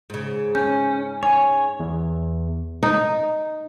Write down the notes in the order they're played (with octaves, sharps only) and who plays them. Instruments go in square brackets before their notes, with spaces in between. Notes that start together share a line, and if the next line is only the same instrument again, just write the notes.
[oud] G#2 C#3
[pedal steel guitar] C#4 [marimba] G6
[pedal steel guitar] C#5 [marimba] G#5
[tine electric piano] E2
[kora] D#4